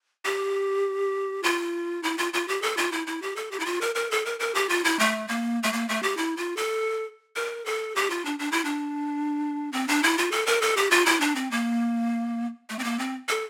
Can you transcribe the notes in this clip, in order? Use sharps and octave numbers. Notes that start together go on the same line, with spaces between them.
G4
F4
E4
F4
F4
G4
A4
F4
E4
E4
G4
A4
G4
E4
F4
A#4
A#4
A4
A#4
A#4
G4
F4
E4
A3
A#3
A3
A#3
A3
G4
E4
F4
A4
A#4
A4
G4
F4
D4
D4
E4
D4
C4
D4
E4
F4
A4
A#4
A4
G4
F4
E4
D4
C4
A#3
A3
C4
A#3
C4
A4